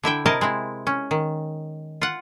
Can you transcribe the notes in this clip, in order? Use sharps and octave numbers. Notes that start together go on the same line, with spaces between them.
D3 E4 E5 G5
C3 E4 A#4 D#5 A5
G#3 C4 E4
C#4
D#3
F4 F#5